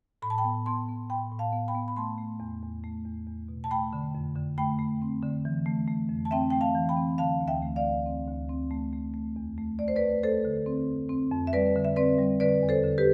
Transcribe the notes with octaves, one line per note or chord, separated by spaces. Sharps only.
A2 B5
A5
G5 B5
B3
B3 A5 C6
B3
A2 G5 B5
A2
F5 A5
B3
G5 B5
B3
B5
A3 A5 C6
A3
E2
E2
A3
E2
E2
B2
A5
A3 G5 B5
D3
F2
D3
A3 G5 B5
A3
C4
D3
E3
A3
A3
F2
A5
C4 E5 G5
A3 G5
F5 A5
E3
G5 B5
C4
D3 F5 A5
D2
E5 G5
A3
D5 F5
D2
C4
D2
C4
A3
A3
A3
E2
A3
A3 D5
C5
B4 D5
A3
A3 A4 C5
D3
C4
F2
C4
F2
E5
G3 B4 D5
D3
E5
C4 B4 D5
G3
D3 B4 D5
E2
A4 C5
D3
G4 B4